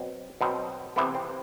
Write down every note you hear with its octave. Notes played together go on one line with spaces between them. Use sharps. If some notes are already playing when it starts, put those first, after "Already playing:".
Already playing: B2 F#3 C4
B2 F#3 C4
C3 E3 B3 C4 E4
C4